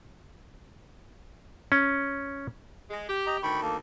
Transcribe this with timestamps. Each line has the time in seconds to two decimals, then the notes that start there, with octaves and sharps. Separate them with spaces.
1.72 C#4
2.90 G#3
3.08 G4
3.27 D#5 G5 A#5
3.43 D2 D#3 G5 B5 C#6
3.62 A#3 A4